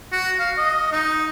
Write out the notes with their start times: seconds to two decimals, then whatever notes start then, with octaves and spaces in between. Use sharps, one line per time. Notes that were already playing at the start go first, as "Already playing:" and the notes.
0.12 F#4
0.39 F5
0.58 D#5
0.92 D#4